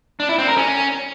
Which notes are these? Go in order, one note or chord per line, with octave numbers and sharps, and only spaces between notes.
D4
E4
C4
A#4
C#4